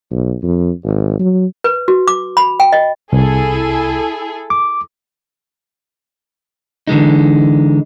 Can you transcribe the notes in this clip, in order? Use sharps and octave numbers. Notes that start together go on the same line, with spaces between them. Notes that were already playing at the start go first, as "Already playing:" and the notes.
B1
F2
G#1
F#3
B4
F#4
D6
B5
G5
D#5
C2 E4 G#4 A4
D6
D3 E3 G#3 D#4